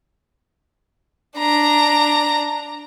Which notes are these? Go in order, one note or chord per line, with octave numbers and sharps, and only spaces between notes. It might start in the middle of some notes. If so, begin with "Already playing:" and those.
D4 A#5